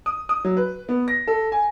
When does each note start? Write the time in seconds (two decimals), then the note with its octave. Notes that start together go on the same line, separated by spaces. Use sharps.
0.06 D#6
0.29 D#6
0.45 F#3
0.57 B4
0.89 B3
1.08 A#6
1.27 A4
1.52 G#5